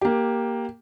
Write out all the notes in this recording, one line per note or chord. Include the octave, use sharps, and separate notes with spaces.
A#3 G4